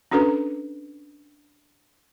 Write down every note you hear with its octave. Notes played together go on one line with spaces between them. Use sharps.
C#4 D4 F#4 A4 B4 A#5